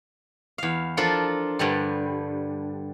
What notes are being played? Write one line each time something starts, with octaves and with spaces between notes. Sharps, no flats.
E2 F5
F3 D4 F4 A4 A#4
G2 D3 G3